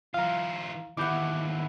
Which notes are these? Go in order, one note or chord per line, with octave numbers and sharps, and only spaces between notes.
E3 F4 F5 A#5
D#2 E3 E4 F#5 D6 G6